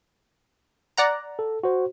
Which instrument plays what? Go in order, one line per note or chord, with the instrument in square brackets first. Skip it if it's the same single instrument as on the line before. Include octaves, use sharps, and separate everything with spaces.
[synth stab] D5 F#5 A#5
[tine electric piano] A4
F#4 C5